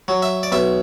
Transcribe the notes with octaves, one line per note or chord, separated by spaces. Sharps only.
F#3
E5
D5
B1 E5